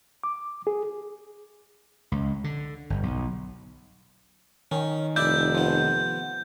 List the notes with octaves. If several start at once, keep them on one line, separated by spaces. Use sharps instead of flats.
D6
G#4
C#2
D3
G1
B1
D#3 C#4
F1 E4 D5 E5 G6
F3 B3